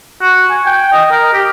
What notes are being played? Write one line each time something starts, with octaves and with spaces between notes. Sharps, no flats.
F#4
G#5
G5
D#5
A#4
G4